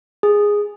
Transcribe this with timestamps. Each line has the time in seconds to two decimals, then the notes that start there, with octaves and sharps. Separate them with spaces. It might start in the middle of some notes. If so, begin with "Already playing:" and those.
0.23 G#4